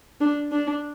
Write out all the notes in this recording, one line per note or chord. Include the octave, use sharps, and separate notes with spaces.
D4
D4